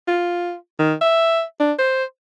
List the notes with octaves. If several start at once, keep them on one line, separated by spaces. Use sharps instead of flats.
F4
D#3
E5
D4
C5